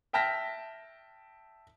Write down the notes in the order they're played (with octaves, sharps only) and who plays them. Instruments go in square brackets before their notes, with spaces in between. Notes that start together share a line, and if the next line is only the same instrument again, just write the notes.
[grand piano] E5 G5 A5 F6 A#6 B6